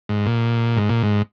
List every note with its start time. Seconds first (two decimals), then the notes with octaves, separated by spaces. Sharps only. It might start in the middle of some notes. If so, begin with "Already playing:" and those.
0.09 G#2
0.26 A#2
0.77 G#2
0.89 A#2
1.03 G#2